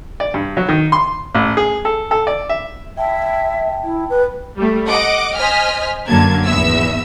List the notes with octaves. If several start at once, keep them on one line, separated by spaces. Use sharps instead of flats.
D5
G2
F#3
D#3
C6
A1
G#4
A4
A4
D5
E5
E5 G5 A5
E4
B4
G3 A3
D#5 F#5 D6
C5 D#5 G#5 F6 B6
F#2 D3 F#3 A#3 A5 G#6
G#1 E2 B3 E5 E6